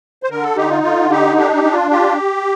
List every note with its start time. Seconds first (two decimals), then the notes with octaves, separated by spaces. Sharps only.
0.23 C5
0.30 D3 A#4
0.43 A4
0.56 D#4 G4
0.70 F4
0.83 D3 F4
1.10 D#4 G4
1.38 D4 G4
1.56 G4
1.64 D4
1.73 F4
1.91 F4 G4